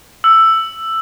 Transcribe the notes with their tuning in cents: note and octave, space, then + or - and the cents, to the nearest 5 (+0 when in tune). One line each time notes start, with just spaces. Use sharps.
E6 +5